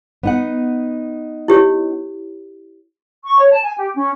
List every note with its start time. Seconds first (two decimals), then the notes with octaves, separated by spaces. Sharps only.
0.23 B3 D#4 F#5
1.48 E4 G4 C#5
3.25 C#6
3.39 C#5
3.51 A5
3.63 G#5
3.77 G4
3.94 C#4